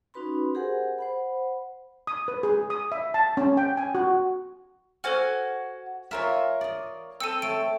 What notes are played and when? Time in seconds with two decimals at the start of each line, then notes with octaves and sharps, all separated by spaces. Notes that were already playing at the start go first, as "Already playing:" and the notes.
0.14 C#4 D#4 F#4 B4 B5 C6
0.55 G4 G#4 A#4 C5 F#5 G#5
0.99 C5 F#5 B5
2.07 D#6
2.28 B4
2.43 G#4
2.70 D#6
2.92 E5
3.14 A5
3.37 C#4
3.57 G5
3.77 G#5
3.95 F#4
5.04 F#4 A4 C5 G#5 F6
6.11 F4 A#4 C#5 E5 G#5
6.61 D5 D#5
7.20 C4 A4 E6 C#7 D#7
7.42 A3 C#5 D7